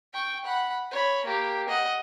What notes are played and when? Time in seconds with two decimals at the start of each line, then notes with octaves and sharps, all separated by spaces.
0.13 G5 C#6
0.44 F#5 B5
0.91 C#5 B5
1.25 A#3 G4
1.68 D#5 F#5